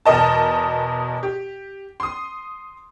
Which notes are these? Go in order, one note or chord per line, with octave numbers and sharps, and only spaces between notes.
E2 B2 A#4 D#5 A5
G4
C6 D#6